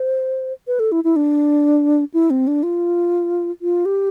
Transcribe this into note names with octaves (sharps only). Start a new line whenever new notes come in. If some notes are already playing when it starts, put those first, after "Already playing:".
Already playing: C5
B4
A4
E4
E4
D4
E4
C4
D4
F4
F4
G4